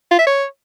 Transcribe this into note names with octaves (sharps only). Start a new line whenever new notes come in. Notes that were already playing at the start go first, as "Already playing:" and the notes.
F4
E5
C#5